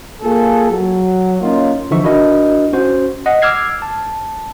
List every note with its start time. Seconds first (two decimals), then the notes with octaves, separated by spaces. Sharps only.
0.22 A#3 F4 G#4 A4
0.71 F#3
1.41 A#3 C#4 D#4 F4
1.91 D3 E3 F3 D#4 E5 C#6
2.04 D4 E4 F#4 A#4 D#5
2.73 C#4 F#4 C5
3.26 D#5 F#5
3.42 D6 E6 F6 G#6 C7
3.82 A5